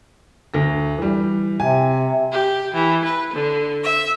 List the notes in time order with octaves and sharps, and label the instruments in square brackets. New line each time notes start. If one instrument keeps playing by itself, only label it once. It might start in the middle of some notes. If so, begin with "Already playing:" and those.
[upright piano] D2 A#6
E3 G3
[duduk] C3 [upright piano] G#5
[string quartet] G4
E3
B4
D3
E5